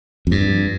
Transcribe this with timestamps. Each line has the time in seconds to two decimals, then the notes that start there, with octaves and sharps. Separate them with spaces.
0.27 F2
0.31 G2